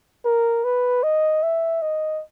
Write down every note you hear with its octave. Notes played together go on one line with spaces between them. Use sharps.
A#4
B4
D#5
E5
D#5